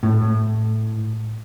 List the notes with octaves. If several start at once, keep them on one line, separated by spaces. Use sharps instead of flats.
A2